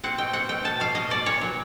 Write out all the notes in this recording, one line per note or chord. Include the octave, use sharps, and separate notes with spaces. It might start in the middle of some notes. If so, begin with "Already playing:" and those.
C4 F#5
B2 G5
C4 F#5
B2 G5
B2 A5
B2 F5
B2 D#5
B2 D5
A#2 C#5
F#3